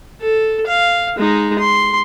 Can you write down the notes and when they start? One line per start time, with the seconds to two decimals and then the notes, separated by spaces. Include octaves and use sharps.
0.21 A4
0.67 F5
1.17 G#3 D#4
1.59 C6